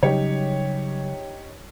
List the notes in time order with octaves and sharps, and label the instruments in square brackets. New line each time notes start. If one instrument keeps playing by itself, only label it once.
[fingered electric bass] C#3 F#3 G3 [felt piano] D#4 G4 C#5